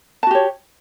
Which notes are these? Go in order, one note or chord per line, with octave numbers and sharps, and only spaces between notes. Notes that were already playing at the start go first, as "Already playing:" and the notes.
F#4 G4 C#5 A5